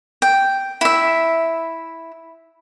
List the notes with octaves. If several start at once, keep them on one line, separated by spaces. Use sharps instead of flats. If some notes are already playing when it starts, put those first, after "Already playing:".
G5
E4 E5